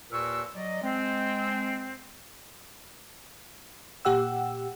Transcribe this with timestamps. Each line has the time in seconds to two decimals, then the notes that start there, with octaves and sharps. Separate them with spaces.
0.11 D#2 A#2 A#4 B4 C#6 E6
0.55 F#3 D5 D#5
0.82 G#3 C4
4.05 A#2 G4 F#5 E6